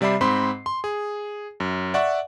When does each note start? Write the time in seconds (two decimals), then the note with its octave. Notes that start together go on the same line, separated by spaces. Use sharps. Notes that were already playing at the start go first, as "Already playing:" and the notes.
0.01 C3 G3 D5 E5 B5 C7
0.21 G#2 C4 B5 C6
0.66 C6
0.84 G#4
1.60 F#2
1.94 D5 E5 F#5 C#6